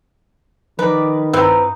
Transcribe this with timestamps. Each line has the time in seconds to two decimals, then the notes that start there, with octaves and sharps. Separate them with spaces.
0.79 D#3 F3 A#4 B4 D5
1.33 G2 C4 D#4 E4 B4 A#5